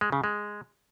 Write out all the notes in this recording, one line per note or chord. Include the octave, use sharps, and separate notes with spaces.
G#3
C#3
G#3